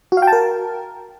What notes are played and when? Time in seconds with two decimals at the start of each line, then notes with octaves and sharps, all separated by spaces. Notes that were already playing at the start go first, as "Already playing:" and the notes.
0.12 F#4
0.17 F5
0.22 G5
0.27 A5
0.33 A#4